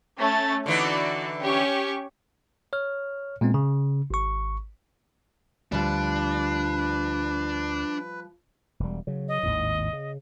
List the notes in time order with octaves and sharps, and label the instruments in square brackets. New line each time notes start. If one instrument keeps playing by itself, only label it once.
[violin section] A3 C#4 A6
[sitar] D3 E3 D#4 [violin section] F#4 D5
[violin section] C#4 G4 C#6
[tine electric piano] C#5 F6
A#2 G#3 B3 C4
C#3
G#1 C#6
[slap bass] D2 [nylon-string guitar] F3 G3 [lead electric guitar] D4 [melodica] B4
[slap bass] E1 G3
C#3 F#3
[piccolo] D#5
[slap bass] G#1 D#2 A2
C#3